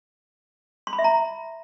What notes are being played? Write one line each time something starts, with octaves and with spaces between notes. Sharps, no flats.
C6
B5
E5
A#5